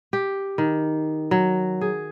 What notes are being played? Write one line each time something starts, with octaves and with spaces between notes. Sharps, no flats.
G4
D#3
F#3
G#4